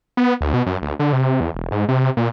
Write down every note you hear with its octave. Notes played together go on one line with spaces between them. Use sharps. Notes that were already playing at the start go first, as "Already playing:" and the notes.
B3
D2
B2
F#2
D2
D3
C3
E2
E1
G#2
C3
A#2